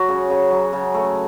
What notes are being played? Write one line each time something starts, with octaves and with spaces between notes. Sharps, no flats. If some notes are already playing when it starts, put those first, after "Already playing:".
Already playing: F#3 F#4
C#3
C#3
F#3
C#3
A3